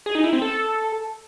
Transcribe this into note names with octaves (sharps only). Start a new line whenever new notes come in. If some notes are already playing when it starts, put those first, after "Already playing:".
G#4
D#4
E4
C4
A4